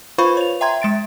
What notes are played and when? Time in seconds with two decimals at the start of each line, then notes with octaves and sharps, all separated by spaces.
0.18 F4 B4 C5 F5 B5 C#6
0.37 C#5 F7
0.61 E5 G5 A#5 C6 G#6
0.82 G#3 A6 D7